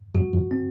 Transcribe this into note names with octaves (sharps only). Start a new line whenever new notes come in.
F#2 F#4
F2
C4